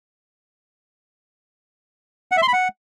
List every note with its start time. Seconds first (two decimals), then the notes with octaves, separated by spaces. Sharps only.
2.32 F#5
2.37 E5
2.42 C6
2.48 B5
2.53 F#5